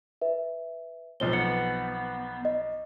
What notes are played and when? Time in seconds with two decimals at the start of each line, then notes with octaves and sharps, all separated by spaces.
0.21 B4 E5
1.20 B1 F3 C4 G7
1.33 B3 C#7
2.45 D#5